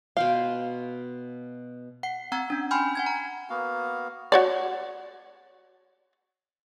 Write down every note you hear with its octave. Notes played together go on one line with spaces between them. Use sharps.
B2 F5 G5 C6
F#5 C7
C4 F#5 A#5 E6 G#6
C#4 D4
G5 G#5 B5 C6 F6 G6
F#5 G#5 G#6
A#5
A#3 B3 F#4 F5
F#4 C#5 D5